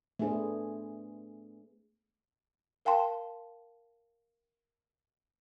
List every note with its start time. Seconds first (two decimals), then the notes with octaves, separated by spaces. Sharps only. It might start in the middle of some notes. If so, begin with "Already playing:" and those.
0.19 A3 B3 D4 G#4 B4 C5
2.85 A#4 F5 G5 A5 C6